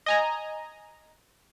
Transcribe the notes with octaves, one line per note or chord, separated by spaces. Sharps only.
D#5 G#5 A#5